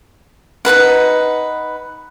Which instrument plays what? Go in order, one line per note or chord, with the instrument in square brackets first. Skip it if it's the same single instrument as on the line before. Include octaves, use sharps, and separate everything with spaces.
[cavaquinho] D#4 E4 B4 F#5